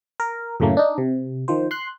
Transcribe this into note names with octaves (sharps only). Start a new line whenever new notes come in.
A#4
F#2 A2 C#3 A3 A#3
D4 D#4
C3
D#3 F3 C5
C6 F#6